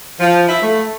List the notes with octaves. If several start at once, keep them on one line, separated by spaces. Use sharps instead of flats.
F3
E4
A3